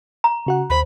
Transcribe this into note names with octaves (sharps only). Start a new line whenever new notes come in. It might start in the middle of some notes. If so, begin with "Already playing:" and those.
A#5
C#3 F#4 F#5
D#2 C5 B5